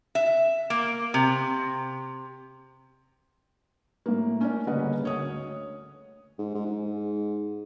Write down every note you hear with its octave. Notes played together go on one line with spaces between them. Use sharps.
E5
A#3
C3
A2 A#3
C#4 D4 D5
G1 C#3 A#3 B4 D#5 F#5
D2 C#5 D#6
G#2
G#2
G#2